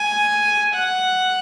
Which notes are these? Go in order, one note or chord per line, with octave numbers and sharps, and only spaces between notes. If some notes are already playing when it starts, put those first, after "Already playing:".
Already playing: G#5
F#5